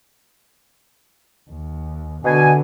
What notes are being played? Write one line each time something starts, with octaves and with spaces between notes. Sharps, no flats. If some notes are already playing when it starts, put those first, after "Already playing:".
D#2
B2 D3 G#5